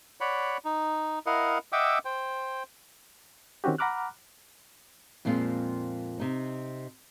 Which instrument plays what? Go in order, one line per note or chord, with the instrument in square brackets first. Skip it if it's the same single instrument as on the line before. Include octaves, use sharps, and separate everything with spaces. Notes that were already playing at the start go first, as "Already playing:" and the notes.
[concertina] C#5 D5 F#5 B5
D#4
E4 A#4 D#5 F5 F#5
D#5 E5 F#5 G5 D6 E6
C5 G5
[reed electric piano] D#3 C4 C#4 F#4 G4
F#5 A#5 B5 D6 F6 F#6
[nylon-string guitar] F2 A#2 G#3 C4 F4
C3 D#4